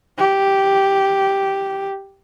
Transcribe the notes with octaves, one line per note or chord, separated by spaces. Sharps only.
G4